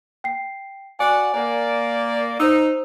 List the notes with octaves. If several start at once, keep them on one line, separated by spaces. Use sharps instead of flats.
G5 C7
F#4 D5 F#5 G#5
A#3 D5
D#4 C5 E6